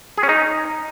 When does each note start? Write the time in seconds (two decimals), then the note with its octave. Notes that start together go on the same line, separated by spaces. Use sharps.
0.18 G#4
0.23 C#4
0.29 D#4